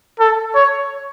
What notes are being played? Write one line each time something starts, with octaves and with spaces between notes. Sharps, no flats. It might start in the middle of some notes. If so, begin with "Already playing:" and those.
A4
C#5